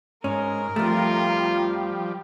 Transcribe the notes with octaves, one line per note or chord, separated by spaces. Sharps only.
G#2 C#4 A#4
F2 F3 G3 A3 F4